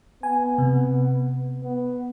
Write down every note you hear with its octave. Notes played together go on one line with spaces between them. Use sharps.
B3 G#5
C3
B3